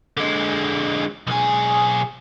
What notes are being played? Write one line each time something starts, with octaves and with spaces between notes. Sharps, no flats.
D3 G#3
B1 G#4